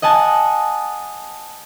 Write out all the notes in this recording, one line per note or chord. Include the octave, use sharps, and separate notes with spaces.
D#5 F#5 G#5 A5